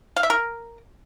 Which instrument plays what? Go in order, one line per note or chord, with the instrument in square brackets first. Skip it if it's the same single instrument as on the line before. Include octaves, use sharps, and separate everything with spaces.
[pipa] F5
E5
A#4